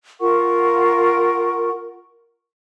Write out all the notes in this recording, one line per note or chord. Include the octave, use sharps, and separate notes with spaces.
F4 A#4 F#5 C#6